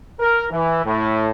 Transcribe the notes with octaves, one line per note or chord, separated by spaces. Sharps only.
A#4
E3
A2